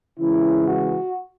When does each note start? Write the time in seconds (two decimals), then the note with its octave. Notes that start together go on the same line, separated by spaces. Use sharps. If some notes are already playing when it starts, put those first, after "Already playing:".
0.20 C#3 E3 G#3 E4
0.68 F#4